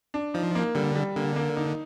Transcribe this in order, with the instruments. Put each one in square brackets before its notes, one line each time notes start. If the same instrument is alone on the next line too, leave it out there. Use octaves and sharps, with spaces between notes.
[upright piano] D4
[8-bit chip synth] F3 [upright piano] D#4
[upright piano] A#3
[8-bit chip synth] D3 [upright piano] G3
[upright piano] G3
[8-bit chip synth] D3 [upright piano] A#3
[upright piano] A#3
D#4